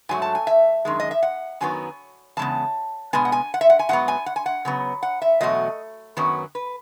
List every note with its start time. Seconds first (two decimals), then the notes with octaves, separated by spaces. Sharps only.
0.09 G#2 F#3 A3 G#5
0.22 A5
0.35 G#5
0.47 E5
0.85 F#2 D#3 G#3
1.00 D#5
1.11 E5
1.23 F#5
1.61 F#2 D#3 F#3 B3 G#5
2.37 E2 C#3 G#3 B3 A5
3.13 B2 G#3 B3 G#5
3.25 F#5
3.32 G#5
3.54 F#5
3.61 E5
3.70 F#5
3.79 G#5
3.89 G#2 F#3 B3 F#5
4.08 G#5
4.26 F#5
4.36 G#5
4.46 F#5
4.65 C#3 F#3 B3
5.03 F#5
5.22 E5
5.41 E2 B2 F#3 A3 D#5
6.17 F#2 D#3 F#3 B3
6.55 B4